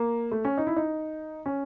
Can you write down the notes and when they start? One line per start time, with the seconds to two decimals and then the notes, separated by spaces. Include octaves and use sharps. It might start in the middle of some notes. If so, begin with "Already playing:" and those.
Already playing: A#3
0.31 A3
0.45 C#4
0.58 D#4
0.67 E4
0.76 D#4
1.46 C#4